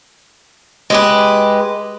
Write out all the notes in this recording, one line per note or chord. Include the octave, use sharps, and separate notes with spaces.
G#3 G4 B4